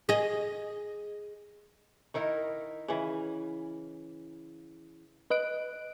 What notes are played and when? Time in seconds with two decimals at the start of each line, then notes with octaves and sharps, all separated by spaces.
0.09 G#4 D#5
2.14 D#3 D#4 E4 A#4
2.88 C#3 E3
5.30 B4 D#5 F#6 D7